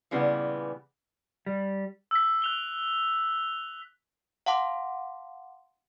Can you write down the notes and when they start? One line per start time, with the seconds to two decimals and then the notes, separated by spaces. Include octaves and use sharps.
0.11 A#2 C#3 E3 G3 B3
1.46 G3
2.11 E6 B6
2.42 F#6 F7 G7
4.46 F5 F#5 A5 C6 D6